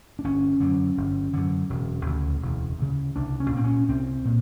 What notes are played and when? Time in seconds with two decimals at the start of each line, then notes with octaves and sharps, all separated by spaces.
0.19 D4
0.24 G1 C#4
0.60 F#2 D3
0.97 G1
1.33 F#2 D3
1.70 E1
2.06 D2 C#3
2.42 E1
2.79 D2 C#3
3.16 C2 D4
3.40 C#4
3.52 A#2 C4
3.64 C#4
3.88 C2 C4
4.25 A#2